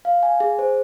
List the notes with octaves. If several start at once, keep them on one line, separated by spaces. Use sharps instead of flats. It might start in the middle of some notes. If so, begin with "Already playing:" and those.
F5
G#5
G#4
C5